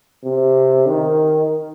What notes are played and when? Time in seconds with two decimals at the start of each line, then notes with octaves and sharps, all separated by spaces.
0.24 C3
0.86 D#3